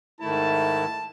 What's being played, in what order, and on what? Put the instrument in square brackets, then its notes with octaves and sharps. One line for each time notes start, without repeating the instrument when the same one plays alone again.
[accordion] G#2 D#3 A3 E4 [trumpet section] A5